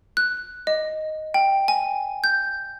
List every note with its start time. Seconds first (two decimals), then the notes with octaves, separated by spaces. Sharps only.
0.17 F#6
0.67 D#5
1.34 G5
1.68 G#5
2.24 G6